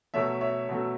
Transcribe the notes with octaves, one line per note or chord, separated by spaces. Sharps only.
B2 F#3 A3 C#5 E5
C#5 E5
B2 F#3 A3